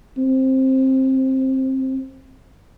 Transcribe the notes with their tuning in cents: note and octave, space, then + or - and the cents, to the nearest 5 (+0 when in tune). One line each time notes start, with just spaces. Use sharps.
C4 +15